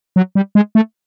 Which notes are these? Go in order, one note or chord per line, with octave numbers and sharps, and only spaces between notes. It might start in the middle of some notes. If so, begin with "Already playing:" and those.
F#3
G3
G#3
A3